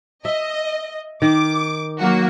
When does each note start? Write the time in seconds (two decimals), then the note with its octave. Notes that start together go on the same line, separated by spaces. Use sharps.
0.25 D#5 E5
1.22 D#3 D6
1.99 F#3 A#3 F#4